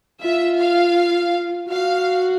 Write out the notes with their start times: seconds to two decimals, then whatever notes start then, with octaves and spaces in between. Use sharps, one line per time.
0.22 F4 E5
0.59 F5
1.69 F#4 F5